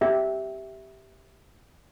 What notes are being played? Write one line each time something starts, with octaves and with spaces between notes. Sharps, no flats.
G4 E5